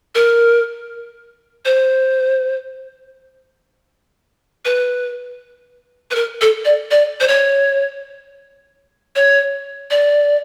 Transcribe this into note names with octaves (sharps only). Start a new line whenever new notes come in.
A#4
C5
B4
B4
A#4
A4
D5
D5
C5
C#5
C#5
D5